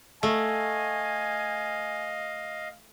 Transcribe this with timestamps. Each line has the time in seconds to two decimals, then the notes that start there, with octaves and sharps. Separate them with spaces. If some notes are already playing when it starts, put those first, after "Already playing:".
0.23 A3 D#5 F5 G#5